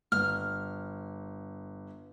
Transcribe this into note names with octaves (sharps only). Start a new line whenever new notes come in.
G1 F6